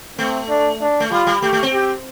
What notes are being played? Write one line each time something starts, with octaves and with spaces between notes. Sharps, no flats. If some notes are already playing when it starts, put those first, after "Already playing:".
A3 C4
D4
D4
A3
G3 F4
G3
A3 G4
A3
C4
G4